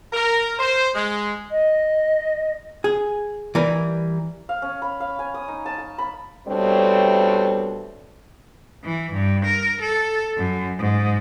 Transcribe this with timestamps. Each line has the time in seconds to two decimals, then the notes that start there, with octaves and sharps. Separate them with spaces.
0.13 A#4
0.59 C5
0.95 G#3
1.51 D#5
2.84 G#4
3.55 E3 G3 A#4
4.49 F5
4.62 C#4
4.82 B5
5.00 F5
5.19 G#5
5.34 D#6
5.48 D#4
5.66 A5
5.78 A5
5.98 B5
6.47 B2 G3 A3 C4 D4 C#5
8.84 E3
9.13 G2
9.46 A#4
9.82 A4
10.37 F#2
10.79 G#2